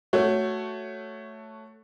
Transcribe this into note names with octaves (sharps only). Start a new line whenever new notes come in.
A3 F#4 C#5